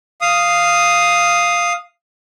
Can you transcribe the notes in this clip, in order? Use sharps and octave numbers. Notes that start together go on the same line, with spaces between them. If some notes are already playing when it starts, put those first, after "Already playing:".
F5 D#6